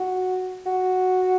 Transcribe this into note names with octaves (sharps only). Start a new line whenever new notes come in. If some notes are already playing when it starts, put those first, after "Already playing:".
Already playing: F#4
F#4